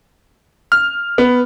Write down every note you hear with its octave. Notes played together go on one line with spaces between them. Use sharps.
F6
B3